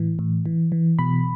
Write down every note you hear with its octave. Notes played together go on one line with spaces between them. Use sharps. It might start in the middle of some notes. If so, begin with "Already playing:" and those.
Already playing: A2 E3
A2
E3
E3
B2 B5